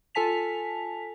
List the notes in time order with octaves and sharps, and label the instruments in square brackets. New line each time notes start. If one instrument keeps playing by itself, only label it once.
[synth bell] F4 A4 G#5 A5 B6 F7